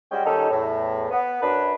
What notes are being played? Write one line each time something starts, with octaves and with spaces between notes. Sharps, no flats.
G3 G#3 C#4 F#4 G5
A#2 D#3 G3 C#4 D#4 A4
E2 A2
B3
F#2 D4 B4